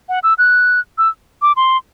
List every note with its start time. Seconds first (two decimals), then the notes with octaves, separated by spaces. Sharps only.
0.09 F#5
0.23 E6
0.38 F#6
0.98 E6
1.42 D6
1.56 C6